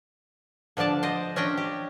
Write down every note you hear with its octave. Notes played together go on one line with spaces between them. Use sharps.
D3 F3 D4 D5 A5
C5 D#5
C#4 D4 D#5 G5
G4